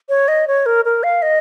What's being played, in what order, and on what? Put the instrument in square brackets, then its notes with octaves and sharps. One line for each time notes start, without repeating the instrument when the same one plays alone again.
[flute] C#5
D#5
C#5
A#4
A#4
F5
D#5